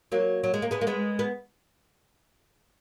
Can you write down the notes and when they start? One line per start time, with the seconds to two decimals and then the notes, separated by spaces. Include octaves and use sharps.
0.12 F#3 A#3
0.44 F#3
0.54 G#3
0.62 A#3
0.71 G#3 B3
0.81 A#3
0.87 G#3 B3
1.19 B3